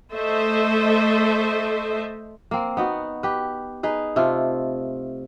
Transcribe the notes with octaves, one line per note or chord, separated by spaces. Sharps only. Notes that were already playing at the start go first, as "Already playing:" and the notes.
A3 A4 C5 D#5 E5
A#3 C4
B3 D#4 F#4
G4 B4
D#4 G#4 B4
C3 A3 F4